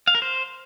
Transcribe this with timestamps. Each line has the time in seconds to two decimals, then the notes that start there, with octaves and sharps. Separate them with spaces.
0.07 F5
0.15 A#4
0.22 C5